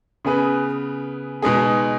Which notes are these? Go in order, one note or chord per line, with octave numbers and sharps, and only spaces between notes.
C#3 B3 G#4 B4
B2 G#3 D#4 G#4